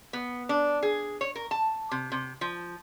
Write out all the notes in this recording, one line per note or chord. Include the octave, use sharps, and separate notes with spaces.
B3
D4
G#4
C#5
A#4
A5
C3
C3
F3